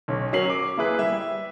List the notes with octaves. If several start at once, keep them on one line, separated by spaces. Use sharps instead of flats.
B1 C#4
F#3 C#4 A#4 C7 F#7
D6
A#3 E4 G#4 B4
G3 E5
E5